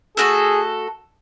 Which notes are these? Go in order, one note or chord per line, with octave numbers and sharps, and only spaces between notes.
A3 C#4 F#4 G#4 A4